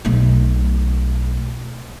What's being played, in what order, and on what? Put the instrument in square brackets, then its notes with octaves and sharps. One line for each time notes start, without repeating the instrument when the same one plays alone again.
[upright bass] B1 A3